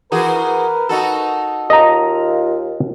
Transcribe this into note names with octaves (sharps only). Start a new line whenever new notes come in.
E3 F#4 G#4 A#4 B4
D#4 F#4 A4
D#2 F4 D#5 A#5